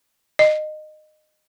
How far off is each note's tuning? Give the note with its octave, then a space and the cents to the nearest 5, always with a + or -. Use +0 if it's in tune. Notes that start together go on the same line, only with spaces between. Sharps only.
D#5 -20